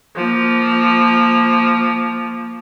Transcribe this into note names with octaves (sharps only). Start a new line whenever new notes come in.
F3 A#3